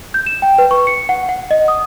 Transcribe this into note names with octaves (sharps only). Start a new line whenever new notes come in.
G6
E7
G5
B4
C#6
C#7
F#5
F#5
D#5
D#6